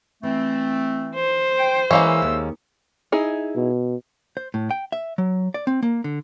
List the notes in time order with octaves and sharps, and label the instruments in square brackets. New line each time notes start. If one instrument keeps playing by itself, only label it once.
[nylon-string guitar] E3 [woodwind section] A3 C4
[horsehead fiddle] C5
[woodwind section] G5
[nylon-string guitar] E3 [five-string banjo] G#3 A#3 C#4 [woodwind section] E5 E6
[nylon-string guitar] D#2
[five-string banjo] D#4 E4 G#4
[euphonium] B2
[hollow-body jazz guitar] C5
A2
G5
E5
F#3
D5
C4
A#3
D3